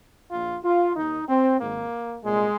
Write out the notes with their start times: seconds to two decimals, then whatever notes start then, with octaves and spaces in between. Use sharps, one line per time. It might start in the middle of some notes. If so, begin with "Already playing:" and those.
0.31 A#1 A#2 F4
0.64 F4
0.96 D#2 D#3 D#4
1.29 C4
1.60 G#1 G#2 D#3 A#3
2.24 C2 A#2 G#3